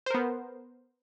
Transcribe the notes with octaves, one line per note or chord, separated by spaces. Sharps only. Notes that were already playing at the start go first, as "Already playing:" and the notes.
B3 A#4 C5